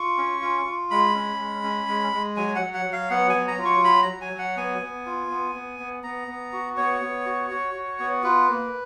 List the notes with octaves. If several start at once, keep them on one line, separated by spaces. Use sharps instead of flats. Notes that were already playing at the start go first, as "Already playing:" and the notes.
Already playing: F4 C#6
C#4
F4
F4
G#3 B5
C#4
G#3
C#4
G#3
G#3
F#3 G#5
F#5
F#3
F#5
F#3
F5
B3 F#5
G#5
F#3
A#5
F4
C#6
F#3 B5
A#5
F#3
G#5
F#3
F#5
B3 G#5
B3
F4
B3
B3
B3
B3 A#5
B3
F#4
B3 C#5
B3
F#4
F#4
F#4
B3
F4 B4
A#3